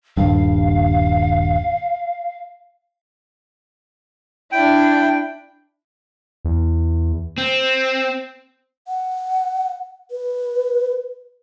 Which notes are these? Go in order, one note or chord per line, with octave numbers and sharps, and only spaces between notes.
D#1 G2 F5
D4 E4 G5
E2
C4
F#5
B4